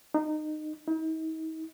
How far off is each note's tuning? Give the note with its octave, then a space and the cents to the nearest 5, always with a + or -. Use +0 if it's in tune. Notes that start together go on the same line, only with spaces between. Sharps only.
D#4 -20
D#4 +45